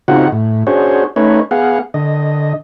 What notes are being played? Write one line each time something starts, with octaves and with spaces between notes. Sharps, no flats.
C#3 C4 D#4 F4 F#4 F#5
A2
C#4 D4 F#4 G#4 C5 C#5
A3 C#4 D#4 B4 C#5
B3 G#4 F5 F#5
D3 D#5